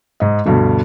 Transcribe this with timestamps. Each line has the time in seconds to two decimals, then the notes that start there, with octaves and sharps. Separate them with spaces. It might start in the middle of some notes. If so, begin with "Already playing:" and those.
0.20 G#2 D#5
0.45 D2 G2 B2 D3